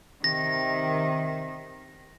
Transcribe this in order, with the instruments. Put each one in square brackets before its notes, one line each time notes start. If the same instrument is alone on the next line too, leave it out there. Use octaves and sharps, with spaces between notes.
[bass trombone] C3 [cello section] D#3 [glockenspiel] A#6